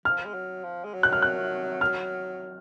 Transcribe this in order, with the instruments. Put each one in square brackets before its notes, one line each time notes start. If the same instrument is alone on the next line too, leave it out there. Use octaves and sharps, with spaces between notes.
[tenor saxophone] F3 [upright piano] F6
[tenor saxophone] G#3
F#3
F3
G#3
F#3
[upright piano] F#6
F6
F#6
F6